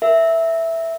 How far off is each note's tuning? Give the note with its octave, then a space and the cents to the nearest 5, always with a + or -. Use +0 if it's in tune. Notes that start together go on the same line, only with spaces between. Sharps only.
A#4 +0 E5 +0